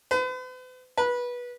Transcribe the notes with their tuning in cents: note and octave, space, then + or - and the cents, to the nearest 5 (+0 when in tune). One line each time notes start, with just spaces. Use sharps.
B4 +45
B4 -20